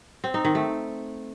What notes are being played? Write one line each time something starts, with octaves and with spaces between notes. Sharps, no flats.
C4
D#4
D#3
A3